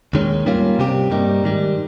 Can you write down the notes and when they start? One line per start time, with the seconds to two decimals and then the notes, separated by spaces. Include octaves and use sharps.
0.13 D#2 D#3 G#3 C#4
0.46 G#2 G3 A#3 C#4 F4
0.78 C2 C3 G3 C4 G4
1.11 G2 G3 A#3 D#4
1.44 G#2 D#3 G3